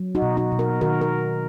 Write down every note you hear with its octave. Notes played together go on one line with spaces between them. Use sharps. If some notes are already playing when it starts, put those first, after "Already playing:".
Already playing: F#3
D#4 F#4
B2
D#4 F#4
B2
F#4 A#4
D#3 F#4 A#4
A#4